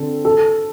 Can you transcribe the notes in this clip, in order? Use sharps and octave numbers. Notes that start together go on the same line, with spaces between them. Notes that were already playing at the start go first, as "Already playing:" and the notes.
Already playing: D3 C4 A4
A4